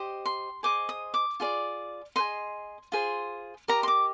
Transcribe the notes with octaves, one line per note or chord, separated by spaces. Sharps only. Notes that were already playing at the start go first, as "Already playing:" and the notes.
Already playing: G4 C5 D#5
C6
G#4 C5 D#5 D6
D#6
D6
F4 G#4 D5
G#4 C5 D#5 C6
F4 G#4 C5
G4 A#4 D#5 A#5
C6
D6